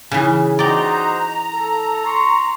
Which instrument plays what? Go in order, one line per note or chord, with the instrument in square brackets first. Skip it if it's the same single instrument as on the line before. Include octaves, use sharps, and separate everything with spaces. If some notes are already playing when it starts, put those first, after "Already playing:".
[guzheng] C#3 E3
[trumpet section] D#4 F#4 C5 [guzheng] D5 G5 [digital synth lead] A#5
[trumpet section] A4
C6 C#6